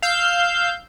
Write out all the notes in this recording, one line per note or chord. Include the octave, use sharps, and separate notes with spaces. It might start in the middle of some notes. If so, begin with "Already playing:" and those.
F5 E6 G6